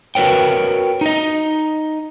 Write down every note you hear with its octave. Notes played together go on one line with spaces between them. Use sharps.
F#4 A#4 B4 C#5 G5
D#4 D#5